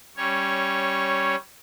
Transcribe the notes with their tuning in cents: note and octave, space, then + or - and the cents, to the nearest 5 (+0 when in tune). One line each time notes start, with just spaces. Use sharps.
G3 -10 C#4 -10 C#5 +0